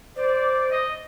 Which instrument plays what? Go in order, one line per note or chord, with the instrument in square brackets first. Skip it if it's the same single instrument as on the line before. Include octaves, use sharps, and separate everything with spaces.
[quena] C5 [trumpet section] D5
[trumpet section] D#5